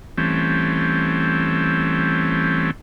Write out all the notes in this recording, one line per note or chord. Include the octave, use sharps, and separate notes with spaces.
E3 G3 A3 C4 C#4